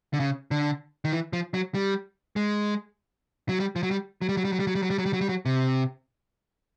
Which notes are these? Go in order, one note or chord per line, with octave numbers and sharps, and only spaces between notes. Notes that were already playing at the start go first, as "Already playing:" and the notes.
D3
C#3
D3
D#3
E3
F3
F#3
G3
G#3
F#3
G3
F3
F#3
G3
F#3
G3
F#3
G3
F#3
G3
F#3
G3
F#3
G3
F#3
G3
F#3
G3
F#3
C3